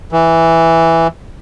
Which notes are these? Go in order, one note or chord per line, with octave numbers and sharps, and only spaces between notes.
E3